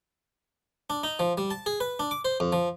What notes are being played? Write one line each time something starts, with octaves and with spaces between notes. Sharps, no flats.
D4
D#4
F3
G3
A5
G#4
B4
D4
D6
C5
F2
F3